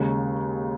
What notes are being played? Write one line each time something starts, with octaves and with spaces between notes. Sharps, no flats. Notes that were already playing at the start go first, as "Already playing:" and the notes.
Already playing: D#2 C#3 G#3